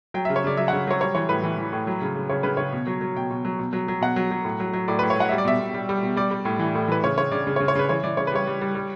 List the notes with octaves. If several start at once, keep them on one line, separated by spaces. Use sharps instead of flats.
F#3 G5
E5
C#3
C#5
C#3 D5
F#3 E5
F#5
C#3
F#3 C#5
G3 C#5
E3 C#5
A2 B4
E3
E3
A2
F#3
C#3
C#3
C#3 C#5
C#3 B4
C#3 C#5
B2
F#3
F#3
B2 G5
B2
F#3
B2
F#3
F#3
B2 F#5
F#3
F#3
A2
F#3
F#3
A2 D5
B4
A2
C#5
F#3 F#5
G3 E5
D5
B2 E5
B2
G3
G3
B2
G3 D5
G3
A2
E3
A2
E3 B4
C#3 C#5
C#3 C#5
C#3 D5
C#3
C#5
C#3
C#5
C#3 B4
E3 C#5
E3 D5
C#3 C#5
B4
G3 C#5
G3
G3
G3